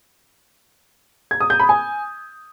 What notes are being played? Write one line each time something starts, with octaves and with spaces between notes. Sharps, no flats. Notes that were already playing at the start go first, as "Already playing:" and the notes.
G#6
D#6
G6
B5
G#5